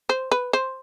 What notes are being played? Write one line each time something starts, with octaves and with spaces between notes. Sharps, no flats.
C5
B4
C5